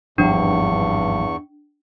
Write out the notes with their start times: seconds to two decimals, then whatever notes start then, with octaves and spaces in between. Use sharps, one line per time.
0.18 G#1 E2 G2 F3 G3 D4 C#6